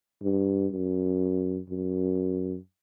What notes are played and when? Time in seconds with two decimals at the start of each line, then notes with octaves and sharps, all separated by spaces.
0.23 G2
0.72 F#2
1.69 F#2